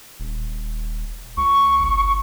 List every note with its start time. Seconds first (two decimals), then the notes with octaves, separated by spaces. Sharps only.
0.20 D#1
1.37 C#2 C#6
1.80 G1